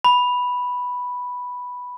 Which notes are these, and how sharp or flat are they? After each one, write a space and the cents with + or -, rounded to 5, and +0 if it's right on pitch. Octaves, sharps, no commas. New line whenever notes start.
B5 -5